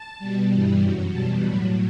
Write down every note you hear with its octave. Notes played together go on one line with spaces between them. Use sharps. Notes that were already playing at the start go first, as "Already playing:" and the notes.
Already playing: A5
B2 G3
G2 E3 G3
F#2 F#3
E2 B2 G3 A5
A2 F#3 B5